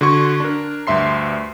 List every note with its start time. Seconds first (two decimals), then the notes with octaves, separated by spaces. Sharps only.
0.01 D3 F#4 C6 C#6 G#6
0.40 D4 A#4
0.87 D2 G2 E5 C6 C7